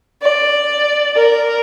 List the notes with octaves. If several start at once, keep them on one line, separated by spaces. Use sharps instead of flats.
D5
A#4